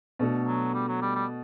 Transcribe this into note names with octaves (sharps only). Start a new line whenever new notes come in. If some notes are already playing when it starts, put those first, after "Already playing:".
B2 A3 D4 A4
F#3
G3
F#3
G3
G3